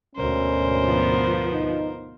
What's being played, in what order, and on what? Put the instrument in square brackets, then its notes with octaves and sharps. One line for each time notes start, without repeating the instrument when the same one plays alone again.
[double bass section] D2 G#2 B2 [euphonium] C#4 [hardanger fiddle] A#4 C5
[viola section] F3 B3
[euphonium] D#4